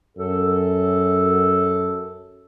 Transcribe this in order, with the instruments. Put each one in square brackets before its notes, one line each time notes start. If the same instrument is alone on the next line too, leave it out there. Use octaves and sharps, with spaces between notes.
[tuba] F#2 [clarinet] A4